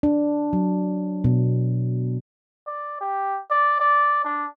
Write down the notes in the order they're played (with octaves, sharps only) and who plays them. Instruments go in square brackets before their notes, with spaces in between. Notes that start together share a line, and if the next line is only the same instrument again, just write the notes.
[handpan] D4
F#3
B2
[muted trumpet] D5
G4
D5
D5
D4